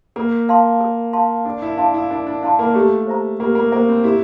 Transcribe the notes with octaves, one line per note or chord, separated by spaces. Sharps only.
A#3 A#4
F5 A5 C6
A#4
F5 A5 C6
D4 A#4
E4
D4 F5 A5 C6
E4
D4 A#4
D4
D4 F5 A5 C6
A#3
A3 G4
C5 E5 A#5
A#3 G4
A#3
A#3 C5 E5 A#5
C4
E4 G4